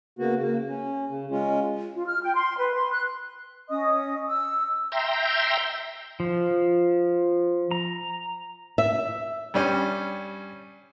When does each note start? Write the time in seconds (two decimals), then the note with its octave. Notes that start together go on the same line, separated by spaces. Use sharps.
0.19 C#3 A#3 B3 F#4
0.39 C#3 A#3
0.69 C#4
1.09 C#3
1.31 G#3 C#4 F4
1.95 F4
2.07 F6
2.23 G5
2.34 C6
2.58 B4
2.74 C6
2.91 F#6
3.70 C#4 D#5 D#6
4.28 E6
4.92 E5 G5 A#5 C6
6.20 F3
7.71 A#5
8.78 E5
9.54 G2 G3 C#4